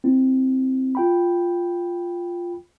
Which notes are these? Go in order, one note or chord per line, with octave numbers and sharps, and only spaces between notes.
C4 E4
F4 G5 B5